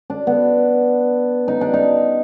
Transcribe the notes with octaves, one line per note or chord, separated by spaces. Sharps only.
D4
B3
D#4
D4
D#4